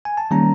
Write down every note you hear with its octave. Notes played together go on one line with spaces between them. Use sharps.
G#5
A5
D#3 G3 A#3 C#4 A#5